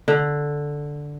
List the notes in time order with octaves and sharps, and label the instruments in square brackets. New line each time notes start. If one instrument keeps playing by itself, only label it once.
[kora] D3